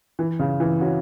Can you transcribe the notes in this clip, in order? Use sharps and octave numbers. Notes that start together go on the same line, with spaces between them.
E3
C#3
E3
C#4 F#4